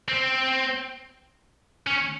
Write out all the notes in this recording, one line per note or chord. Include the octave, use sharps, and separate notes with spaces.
C4
C#4